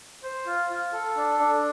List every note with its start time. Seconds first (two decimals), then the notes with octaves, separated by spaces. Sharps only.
0.23 C5
0.46 F4
0.70 F4
0.93 A4
1.16 D4
1.39 D4